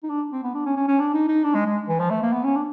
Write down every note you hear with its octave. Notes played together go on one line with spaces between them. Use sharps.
D#4
D4
C4
B3
D4
C#4
C#4
C#4
D4
D#4
D#4
D4
G#3
G#3
E3
F3
A3
A#3
B3
C#4
D4